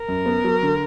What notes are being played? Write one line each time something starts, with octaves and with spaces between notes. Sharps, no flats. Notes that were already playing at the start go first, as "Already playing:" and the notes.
Already playing: A#4
F#2
B3
F#3
D3